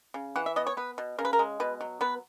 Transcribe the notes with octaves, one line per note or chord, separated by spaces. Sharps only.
C#3
E3 F#5
E5
B3 D#5
C#5
B3 B4
B2
C#3 A#4
B4
A#4
G#3
B2 B4
F#3
B3 B4